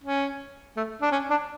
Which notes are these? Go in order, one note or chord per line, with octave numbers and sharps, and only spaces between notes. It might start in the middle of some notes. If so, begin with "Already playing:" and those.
C#4
A3
D4
C#4
D4